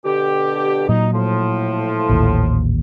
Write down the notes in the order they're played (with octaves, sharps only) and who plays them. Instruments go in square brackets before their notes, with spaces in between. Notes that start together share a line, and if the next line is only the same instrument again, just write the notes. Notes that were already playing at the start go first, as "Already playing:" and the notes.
[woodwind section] B2 D3 G4
[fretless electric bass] A#2 F#3 [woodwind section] D#4
[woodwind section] A2 F3
[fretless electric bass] A1 D#2 A#2